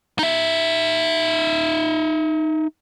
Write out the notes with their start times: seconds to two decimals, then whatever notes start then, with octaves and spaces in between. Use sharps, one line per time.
0.19 D#4 E5